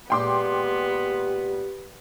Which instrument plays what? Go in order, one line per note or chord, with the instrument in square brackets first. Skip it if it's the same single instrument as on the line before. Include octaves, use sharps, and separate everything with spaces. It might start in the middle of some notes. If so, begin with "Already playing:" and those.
[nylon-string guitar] A#2 G#3 [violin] B3 [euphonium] G4 [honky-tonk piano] G5 C6 D6